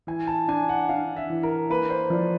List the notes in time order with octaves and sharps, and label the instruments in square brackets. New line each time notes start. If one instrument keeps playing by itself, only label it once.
[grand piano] E3 G#5
A5
D4 G#5
F#5
D4 F5
E5
E3
A#4
A#3 B4
C5
F3 D5